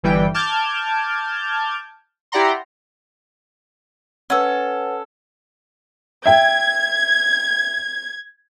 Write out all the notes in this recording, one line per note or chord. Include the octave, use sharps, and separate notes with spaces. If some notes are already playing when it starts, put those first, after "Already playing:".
G1 E3 G3 G5
A5 D6 F6 G6 G#6
E4 G4 D5 F#5 A#5 C6
C#4 A4 B4 C#5 F#5
E5 G5 G#6